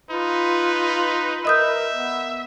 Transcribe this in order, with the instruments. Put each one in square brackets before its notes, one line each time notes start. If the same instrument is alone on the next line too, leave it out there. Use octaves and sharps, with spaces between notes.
[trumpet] D#4 [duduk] F4 [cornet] B4
[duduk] A#4 [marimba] D#5 D#6 G6 [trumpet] E5
[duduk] B3